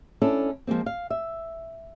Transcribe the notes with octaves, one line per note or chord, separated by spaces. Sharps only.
C#4 D4 E4 A4
F3 G#3 A#3 C4
F5
E5